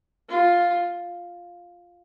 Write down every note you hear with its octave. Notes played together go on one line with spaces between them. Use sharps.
F4